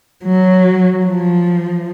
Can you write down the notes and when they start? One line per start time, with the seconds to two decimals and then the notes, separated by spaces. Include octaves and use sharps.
0.24 F#3
1.05 F3